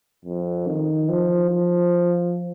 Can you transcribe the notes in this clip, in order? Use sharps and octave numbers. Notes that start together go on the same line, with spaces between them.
F2
D#3
F3
F3